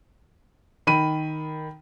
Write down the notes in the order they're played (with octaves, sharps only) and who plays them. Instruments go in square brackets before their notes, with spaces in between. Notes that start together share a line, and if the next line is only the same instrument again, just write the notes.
[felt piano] D#3 B5 D#7